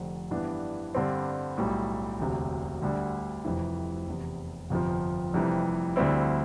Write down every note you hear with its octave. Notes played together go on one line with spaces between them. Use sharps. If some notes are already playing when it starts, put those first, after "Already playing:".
Already playing: F1 F2 D3
G2 E3 B3 D4
G2 D3 G3 C4
B1 A2 G3
E1 D2 C3
D2 D3 G3
F1 F2 C3 E3
F1 E2 C3
G1 F2 C3 F3
F1 F2 C3 E3 G3
D2 D3 G3 C4 E4